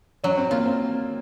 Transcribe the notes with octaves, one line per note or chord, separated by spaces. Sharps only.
F#3 C#4
C4
A#3 F4
C4